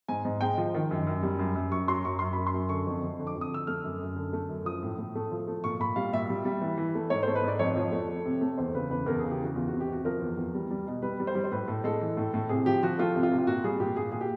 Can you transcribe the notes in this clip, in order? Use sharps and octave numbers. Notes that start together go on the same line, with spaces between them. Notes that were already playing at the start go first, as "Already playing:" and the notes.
G#2 G#5
G#2
G#3 G5
F3
D#3
F#2
F#2
G3
F#2
F#2
F#2 C#6
F#3 C6
F#2 C#6
F#2 C6
F#2 B5
C6
F#2
D3 C#6
F2
F2
D3
D6
F2
D#6
D3 E6
A3 F6
F#2
F#2
D3
A3
F#2
F3 D#6
A2
A2
A3
F3
A3
A#2 C#6
A#2 B5
G3 F5
A#2 E5
G3
G3
E3
E3
A3
G#2 C#5
A3 C5
B4
G#2 D5
F2 C#5
F3
A3
A3
C3
A3
E2 C5
C#3 B4
E2 B4
E2 A#4
A4
C#3 G#4
G4
E3
F#4
E2 F4
F#4
C3
G4
C3 F#4
F3 A#4
E2
E2
G3
G3
B2
G3 B4
G3
C5
G3
C5
A2 B4
A2
G#3 A4
E3
A2
A2
C3 G#4
F3 G4
F3 F#4
A3 F4
C3
F4
C3
F4
A#2 F#4
G3 G#4
A#2 G4
A#2 G#4
A#2 G#4
G4